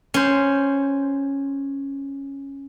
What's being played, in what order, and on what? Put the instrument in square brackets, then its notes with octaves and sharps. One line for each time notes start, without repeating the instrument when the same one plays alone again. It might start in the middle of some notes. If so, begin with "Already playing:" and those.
[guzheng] C#4 C5